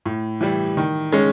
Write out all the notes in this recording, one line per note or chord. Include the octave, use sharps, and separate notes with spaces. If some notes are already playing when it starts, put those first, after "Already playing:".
A2
E3 G3
D#3
G#3 C#4